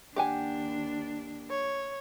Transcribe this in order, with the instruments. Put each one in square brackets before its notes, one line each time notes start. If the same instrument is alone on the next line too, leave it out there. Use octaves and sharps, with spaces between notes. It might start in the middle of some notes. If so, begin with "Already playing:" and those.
[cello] D#2 D4 [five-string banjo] G4 F#5 G#5
[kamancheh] C#5